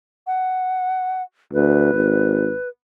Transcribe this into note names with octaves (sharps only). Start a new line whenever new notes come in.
F#5
D2 B4
G#1